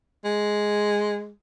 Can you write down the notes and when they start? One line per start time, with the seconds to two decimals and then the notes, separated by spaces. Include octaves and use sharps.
0.25 G#3